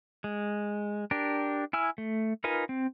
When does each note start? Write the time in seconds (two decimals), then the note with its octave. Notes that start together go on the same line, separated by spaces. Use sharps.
0.24 G#3
1.11 D4 G4 A#4
1.73 E4 G#5 E6 F6
1.98 A3
2.44 D#4 F4 A#4 B4 G#5
2.69 C4